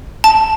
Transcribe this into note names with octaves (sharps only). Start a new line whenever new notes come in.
A5